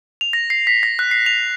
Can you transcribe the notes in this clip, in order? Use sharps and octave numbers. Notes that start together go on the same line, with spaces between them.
F7
A#6
C7
B6
A#6
F#6
C7
F7